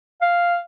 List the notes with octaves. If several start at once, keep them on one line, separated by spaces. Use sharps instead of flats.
F5